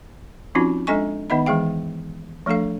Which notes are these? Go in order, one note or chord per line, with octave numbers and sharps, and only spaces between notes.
F3 C4 C#4 D#4 F4 F#4
G#3 D4 A4 D#5 G#5 C#6
D#3 B3 D#4 D#5 E5 B5
E3 G#3 G#4 F5 G5
F3 A3 D4 A4 F5